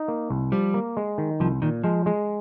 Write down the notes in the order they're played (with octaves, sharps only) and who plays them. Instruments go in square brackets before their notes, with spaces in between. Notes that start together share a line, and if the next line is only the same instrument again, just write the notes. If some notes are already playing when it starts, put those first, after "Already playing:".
Already playing: [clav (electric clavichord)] D#4
A#3
C2
[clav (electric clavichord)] F3 [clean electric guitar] G3
[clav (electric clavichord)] A#3
G#3
D#3
[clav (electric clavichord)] C2 [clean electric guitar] F3
[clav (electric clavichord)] A#2 [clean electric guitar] D#3
[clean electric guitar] F3 [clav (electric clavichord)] G#3
[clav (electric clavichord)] G#3